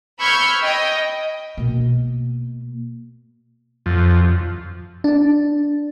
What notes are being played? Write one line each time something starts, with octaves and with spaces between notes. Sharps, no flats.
B5 C#6 E6 F6 G6 G#6
D#5 G5
B2 A#3
F2
D4